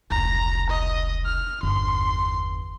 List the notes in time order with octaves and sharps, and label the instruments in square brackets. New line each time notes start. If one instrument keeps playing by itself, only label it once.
[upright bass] F1 C#2 [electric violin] A#5
[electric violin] D#5
F6
[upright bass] G1 E2 [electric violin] C6